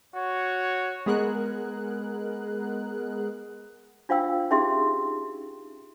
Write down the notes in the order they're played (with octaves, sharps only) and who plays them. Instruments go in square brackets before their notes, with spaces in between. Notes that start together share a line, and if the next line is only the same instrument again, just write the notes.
[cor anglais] F#4 [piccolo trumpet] C#5
[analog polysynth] G#3 B3 G#4 A#4 F#6
[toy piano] D4 F4 C5 F5 G5 E6
C#4 D#4 G4 G#4 E5 C6